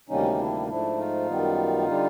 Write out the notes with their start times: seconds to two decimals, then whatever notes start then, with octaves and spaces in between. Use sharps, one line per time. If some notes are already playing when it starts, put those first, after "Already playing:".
0.09 D2 C3 D#3 G3 A#3 C#4 D#4
0.39 D4 E4
0.68 G#2 F3 A3 D4 E4
0.98 D#4 F4
1.27 F#2 D#3 G3 B3
1.87 D3 G3